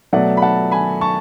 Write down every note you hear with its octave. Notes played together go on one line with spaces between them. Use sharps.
B2 F#3 A3 D5 F#5
B5
F#5 A5
G#5 B5
A5 C#6